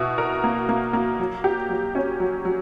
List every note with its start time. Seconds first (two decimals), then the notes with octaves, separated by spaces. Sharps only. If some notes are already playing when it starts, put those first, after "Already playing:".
Already playing: B2 E4
0.18 A#4
0.44 A#3
0.69 A#3
0.93 A#3
1.19 F#3
1.44 G4
1.69 F#3
1.95 C#4
2.20 F#3
2.45 F#3